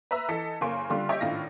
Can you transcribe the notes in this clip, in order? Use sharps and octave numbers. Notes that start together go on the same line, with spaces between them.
B4 E5 A#5 B5 E6
E3 A4 D#5 B6 C#7
F#1 C#3 A#3 G#5 C6 D7
D3 G3 F4 C6
G4 C#5 D#5 E5 G5
G#1 A2 D4 F4 A#6